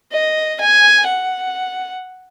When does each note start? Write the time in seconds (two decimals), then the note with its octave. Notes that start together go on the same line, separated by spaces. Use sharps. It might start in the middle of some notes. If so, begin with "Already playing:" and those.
0.13 D#5
0.60 G#5
1.07 F#5